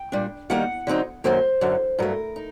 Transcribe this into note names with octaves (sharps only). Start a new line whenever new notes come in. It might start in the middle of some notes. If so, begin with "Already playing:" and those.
Already playing: G5
A#2 G3 D4
D#3 G3 A#3 D#4 F#5
D3 F#3 C4 D#4
F#2 D#3 F#3 A#3 C5
F#2 D3 F#3
G2 F#3 A3 A#4
D#4